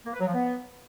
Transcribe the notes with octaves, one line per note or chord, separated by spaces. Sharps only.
A#3
B4
F#3
F3
B3